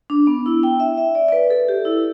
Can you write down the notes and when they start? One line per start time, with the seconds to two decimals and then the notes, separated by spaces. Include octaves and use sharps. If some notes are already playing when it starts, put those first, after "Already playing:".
0.10 D4
0.27 B3
0.46 E4
0.63 G5
0.80 E5
0.98 E5
1.15 D5
1.28 D5
1.32 B4
1.50 A4
1.69 G4
1.85 E4